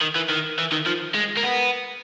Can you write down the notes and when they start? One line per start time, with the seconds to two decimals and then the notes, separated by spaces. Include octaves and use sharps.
0.01 D#3
0.15 E3
0.29 D#3
0.59 E3
0.72 D#3
0.87 F3
1.15 G#3
1.37 A#3
1.43 B3